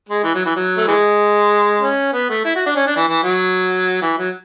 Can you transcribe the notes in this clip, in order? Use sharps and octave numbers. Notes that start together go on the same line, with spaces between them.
G#3
E3
F#3
E3
F#3
A3
E3 G#3
C#4
B3
A3
E4
F#4
D4
C#4
D4
E3
E3
F#3
E3
F#3